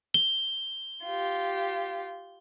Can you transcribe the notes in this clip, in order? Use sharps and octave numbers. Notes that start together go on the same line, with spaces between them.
G7
F4 G4